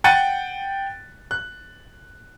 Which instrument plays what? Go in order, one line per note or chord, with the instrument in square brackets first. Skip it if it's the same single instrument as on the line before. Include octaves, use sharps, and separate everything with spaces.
[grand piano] F#5 G5 F#6 A6 C#7 D#7
F#6